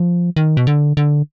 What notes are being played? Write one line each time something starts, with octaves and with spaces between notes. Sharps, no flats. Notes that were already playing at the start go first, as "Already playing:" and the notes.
Already playing: F3
D#3
B2
D3
D3